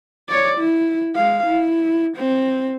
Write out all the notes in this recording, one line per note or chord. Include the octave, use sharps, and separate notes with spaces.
C#5 D5
E4
G#3 F5
E4
C4